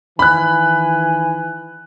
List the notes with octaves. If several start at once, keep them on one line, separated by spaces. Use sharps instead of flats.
D#3 E3 G#5 B5 F#6